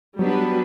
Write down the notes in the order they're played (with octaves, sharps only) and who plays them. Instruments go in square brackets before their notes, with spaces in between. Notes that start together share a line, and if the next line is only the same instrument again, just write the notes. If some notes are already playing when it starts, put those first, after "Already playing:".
[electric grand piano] F#3 [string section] G3 B3 D4 F#4 B4